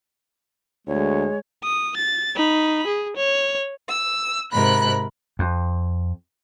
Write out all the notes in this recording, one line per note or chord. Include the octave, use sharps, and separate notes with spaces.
D2 G#3 C#5
D#6
A6
D#4 B5
G#4
C#5
E6
G#2 C3 A#4 B5 F#6
F2